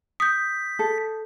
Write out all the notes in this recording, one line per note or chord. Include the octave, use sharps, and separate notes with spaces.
D#6 G6 B6
A4